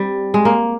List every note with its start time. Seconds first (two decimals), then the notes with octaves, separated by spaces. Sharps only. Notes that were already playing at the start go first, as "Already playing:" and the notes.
Already playing: G3 C4
0.34 G#3
0.45 A#3